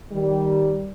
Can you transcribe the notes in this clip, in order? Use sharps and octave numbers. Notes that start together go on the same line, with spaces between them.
D#3 G3